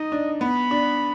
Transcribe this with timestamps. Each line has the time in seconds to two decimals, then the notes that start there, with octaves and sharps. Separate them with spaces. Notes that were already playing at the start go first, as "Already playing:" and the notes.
Already playing: D#4 D#5
0.12 D4
0.41 B3 B5
0.71 D4